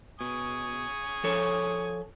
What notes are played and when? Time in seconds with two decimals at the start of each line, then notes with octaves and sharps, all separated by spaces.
0.21 B2 G#5 C#6 D#6
1.24 F3 A4 C#5